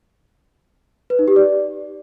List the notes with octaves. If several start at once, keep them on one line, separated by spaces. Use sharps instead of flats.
B4
D#4
G4
D5